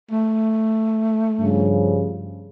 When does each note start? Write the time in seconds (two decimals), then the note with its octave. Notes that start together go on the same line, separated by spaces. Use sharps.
0.11 A3
1.40 G2 C#3 F3